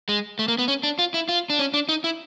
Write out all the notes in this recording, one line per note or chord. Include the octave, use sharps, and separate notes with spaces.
G#3
A3
A#3
B3
C#4
D4
F4
E4
F4
D4
C#4
D4
D#4
E4